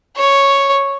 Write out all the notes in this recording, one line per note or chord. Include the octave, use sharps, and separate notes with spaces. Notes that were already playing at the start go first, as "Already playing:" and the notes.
C#5